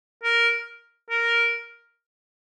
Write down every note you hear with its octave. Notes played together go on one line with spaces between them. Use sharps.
A#4
A#4